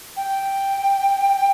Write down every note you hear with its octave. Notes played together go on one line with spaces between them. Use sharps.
G5